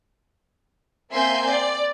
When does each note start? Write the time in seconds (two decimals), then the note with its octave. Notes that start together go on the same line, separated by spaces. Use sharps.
1.12 A#3 C4 E5 G#5 C6 G6
1.49 D5